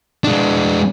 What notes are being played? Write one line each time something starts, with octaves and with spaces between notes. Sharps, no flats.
G#3 D4